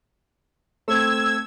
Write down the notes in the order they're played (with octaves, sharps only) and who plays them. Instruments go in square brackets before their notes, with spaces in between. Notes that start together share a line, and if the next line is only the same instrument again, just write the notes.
[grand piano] A3 C4 [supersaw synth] E6 G#6